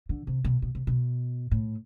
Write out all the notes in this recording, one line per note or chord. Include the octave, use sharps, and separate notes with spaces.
D3
C3
B2
B2
C3
B2
A2